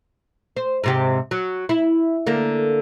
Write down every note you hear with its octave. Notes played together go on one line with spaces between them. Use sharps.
C5
G#2 C3 G4
F#3
E4
D3 A#3